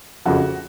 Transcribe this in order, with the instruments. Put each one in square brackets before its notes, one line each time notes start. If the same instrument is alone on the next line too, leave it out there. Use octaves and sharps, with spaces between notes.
[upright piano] F#1 F2 C#3 F3 F#4